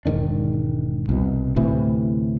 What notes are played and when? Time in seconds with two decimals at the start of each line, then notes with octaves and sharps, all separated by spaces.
0.05 E1 G#2 D#3 D4
1.09 C2 B2
1.56 D2 A2 C3 E3